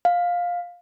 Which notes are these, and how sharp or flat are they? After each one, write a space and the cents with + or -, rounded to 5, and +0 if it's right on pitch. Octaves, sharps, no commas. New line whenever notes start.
F5 +10